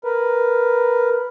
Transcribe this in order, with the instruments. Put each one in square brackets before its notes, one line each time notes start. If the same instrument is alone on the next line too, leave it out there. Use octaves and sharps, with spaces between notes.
[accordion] A#4 B4